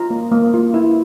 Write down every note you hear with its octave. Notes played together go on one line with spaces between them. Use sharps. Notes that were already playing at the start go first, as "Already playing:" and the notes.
Already playing: F4 A#5
A#3
A#3
F4
E4